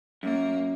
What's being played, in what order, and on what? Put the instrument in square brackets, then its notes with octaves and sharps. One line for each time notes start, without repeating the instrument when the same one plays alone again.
[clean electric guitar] F#2 [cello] A#3